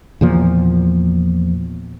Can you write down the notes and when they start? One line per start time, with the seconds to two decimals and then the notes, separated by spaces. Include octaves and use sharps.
0.21 E2 A#2 F3